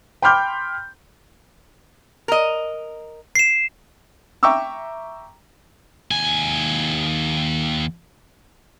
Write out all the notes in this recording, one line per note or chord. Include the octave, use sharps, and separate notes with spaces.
G5 B5 C6 D6 F6 G6
A#4 D#5
C7 E7
E5 G5 A#5 C#6 D6 E6
D#2 G#5